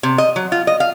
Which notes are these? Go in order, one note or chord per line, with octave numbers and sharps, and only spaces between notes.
C3
D#5
F#3
F4
D#5
F5